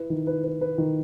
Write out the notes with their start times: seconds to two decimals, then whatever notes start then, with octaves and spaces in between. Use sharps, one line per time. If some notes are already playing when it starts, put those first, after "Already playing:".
Already playing: E4 B4
0.10 D#3
0.27 B4
0.44 B4
0.61 B4
0.78 D#3